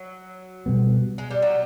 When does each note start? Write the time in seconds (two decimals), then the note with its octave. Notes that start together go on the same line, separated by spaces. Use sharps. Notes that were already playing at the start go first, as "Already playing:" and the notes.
Already playing: F#3
0.66 B2 G3 B3
1.18 G#3
1.31 G3
1.42 F#3